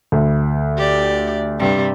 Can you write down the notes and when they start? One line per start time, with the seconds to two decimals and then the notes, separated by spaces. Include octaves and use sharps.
0.12 D2
0.77 G4 D5
1.59 G2 C3 G3